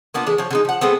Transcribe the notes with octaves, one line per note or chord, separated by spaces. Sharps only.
A#3 B3 D4 F4
E3 G#3 A3 D4
F3 C#5
D3 G#3 D#4
F3 F#5
G#3 A3 B3 C4